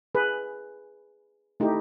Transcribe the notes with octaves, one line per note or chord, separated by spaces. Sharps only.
G#4 B4
A3 D#4 E4 G4